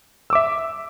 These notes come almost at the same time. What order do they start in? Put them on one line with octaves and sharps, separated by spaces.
E6 D6 E5